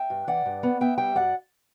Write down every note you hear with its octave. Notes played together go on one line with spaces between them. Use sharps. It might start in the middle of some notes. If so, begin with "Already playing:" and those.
Already playing: E5 G5
G2
E3 D5 F#5
G2
B3
B3 E5 G5
G3 E5 G5
F#2 D5 F#5